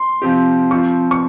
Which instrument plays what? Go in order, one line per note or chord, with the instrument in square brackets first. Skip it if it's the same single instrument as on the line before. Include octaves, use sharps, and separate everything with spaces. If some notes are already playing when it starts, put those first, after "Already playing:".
Already playing: [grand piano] C6
[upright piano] C3 F3 C4 G4
[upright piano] F3 C4 F4 [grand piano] C#6
[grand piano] C#6